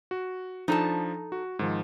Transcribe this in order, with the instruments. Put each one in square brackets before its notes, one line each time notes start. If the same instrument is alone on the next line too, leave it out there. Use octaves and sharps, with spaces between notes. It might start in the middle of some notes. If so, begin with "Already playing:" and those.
[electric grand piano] F#4
[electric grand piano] F3 D4 [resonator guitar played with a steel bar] D#4 A4 A5
[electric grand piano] F#4
G#2 D#3 F3